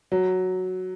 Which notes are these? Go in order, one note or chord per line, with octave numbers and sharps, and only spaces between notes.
F#3